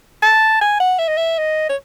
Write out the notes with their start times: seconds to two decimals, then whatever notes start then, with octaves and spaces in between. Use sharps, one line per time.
0.22 A5
0.61 G#5
0.80 F#5
0.99 E5
1.08 D#5
1.17 E5
1.38 D#5
1.69 C#5